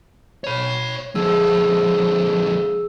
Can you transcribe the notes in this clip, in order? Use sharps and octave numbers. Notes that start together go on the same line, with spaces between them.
C#5 B5
D3 F3 G#4 E6